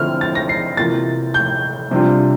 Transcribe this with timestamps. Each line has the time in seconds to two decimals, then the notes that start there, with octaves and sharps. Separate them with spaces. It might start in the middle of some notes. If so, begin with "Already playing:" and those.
Already playing: D3 F3 C4 E4 F6
0.21 A6
0.35 A#6
0.49 C7
0.77 C3 E3 A#3 F4 A6
1.34 G6
1.91 C3 G3 D4 F4